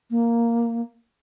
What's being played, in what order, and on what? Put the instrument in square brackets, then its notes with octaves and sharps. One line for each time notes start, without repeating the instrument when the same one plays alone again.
[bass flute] A#3